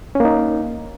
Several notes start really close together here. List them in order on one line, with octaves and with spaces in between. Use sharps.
C#4 A#3 D#4